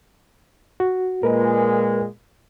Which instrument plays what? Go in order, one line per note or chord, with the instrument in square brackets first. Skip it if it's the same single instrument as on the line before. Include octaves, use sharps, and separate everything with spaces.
[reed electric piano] F#4
[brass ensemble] A#2 G#3 [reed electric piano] A#4 B4